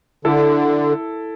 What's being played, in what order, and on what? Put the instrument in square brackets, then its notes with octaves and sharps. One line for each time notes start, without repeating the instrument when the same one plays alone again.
[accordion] D3 [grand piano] E4 A4